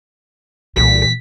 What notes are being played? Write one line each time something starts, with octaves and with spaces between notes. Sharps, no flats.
C2 A#2 E3 B6